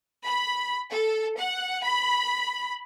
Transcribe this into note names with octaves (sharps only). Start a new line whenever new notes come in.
B5
A4
F#5
B5